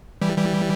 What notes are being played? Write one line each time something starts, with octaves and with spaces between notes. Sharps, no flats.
E3 G3
E3 G3